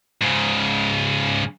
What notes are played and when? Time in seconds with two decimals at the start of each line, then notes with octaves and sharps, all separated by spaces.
0.22 G#2 C#3